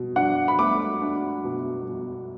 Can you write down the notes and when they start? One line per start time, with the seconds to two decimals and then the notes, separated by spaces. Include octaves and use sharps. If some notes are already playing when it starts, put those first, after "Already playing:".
Already playing: B2
0.16 D4 F#5
0.48 B5
0.59 A3 D6
1.02 D4
1.44 B2
1.87 B2